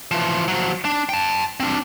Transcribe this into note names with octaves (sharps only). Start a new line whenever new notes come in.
E3 F3
F3 F#3
D4
G5 A5
C4 D4